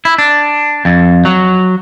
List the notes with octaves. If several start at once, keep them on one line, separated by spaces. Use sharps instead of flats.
E4
D4
F2
F#3